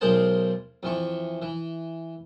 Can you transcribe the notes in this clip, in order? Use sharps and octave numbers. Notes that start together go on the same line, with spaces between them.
B1 G#3 G#4 A#4 C5 A5
F2 E3 C#6
E3